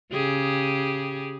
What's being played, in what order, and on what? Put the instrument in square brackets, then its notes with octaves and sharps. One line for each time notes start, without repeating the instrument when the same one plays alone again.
[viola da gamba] C#3 G4 G#4